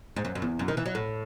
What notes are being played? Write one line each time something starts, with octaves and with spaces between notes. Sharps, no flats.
G#2
F#2
F#2
E2
F#2
D#3
E3
F#3
A2